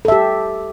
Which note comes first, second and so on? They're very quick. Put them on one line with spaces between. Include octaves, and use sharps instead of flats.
A4 E5 G4